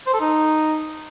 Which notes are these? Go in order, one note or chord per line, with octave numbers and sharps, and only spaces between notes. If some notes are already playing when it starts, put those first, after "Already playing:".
C5
A4
D#4